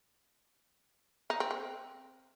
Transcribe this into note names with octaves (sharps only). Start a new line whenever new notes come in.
D#4
C4
C4